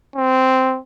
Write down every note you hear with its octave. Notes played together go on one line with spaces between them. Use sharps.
C4